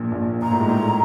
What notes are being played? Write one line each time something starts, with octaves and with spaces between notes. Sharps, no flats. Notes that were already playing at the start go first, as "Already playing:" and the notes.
Already playing: A#1 A#2
A#1 A#2
A#2 A#5
A2
G#2
A2